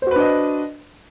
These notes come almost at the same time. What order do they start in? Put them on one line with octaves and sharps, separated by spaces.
C5 F#4 B4 D4 D#5